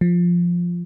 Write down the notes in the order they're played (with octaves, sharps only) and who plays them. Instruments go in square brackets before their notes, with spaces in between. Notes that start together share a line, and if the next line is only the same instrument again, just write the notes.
[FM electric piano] F3